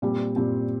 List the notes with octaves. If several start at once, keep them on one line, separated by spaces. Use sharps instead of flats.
A#2 G3 C4
A#2 G3 C4